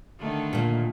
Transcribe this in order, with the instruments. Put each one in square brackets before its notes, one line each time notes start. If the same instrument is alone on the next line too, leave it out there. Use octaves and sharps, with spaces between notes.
[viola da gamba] D3 D#3 A3
[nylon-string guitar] A#2 A#3